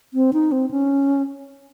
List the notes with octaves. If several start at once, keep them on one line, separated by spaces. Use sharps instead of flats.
C4
D#4
C4
C#4